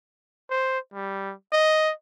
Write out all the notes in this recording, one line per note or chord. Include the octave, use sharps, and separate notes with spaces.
C5
G3
D#5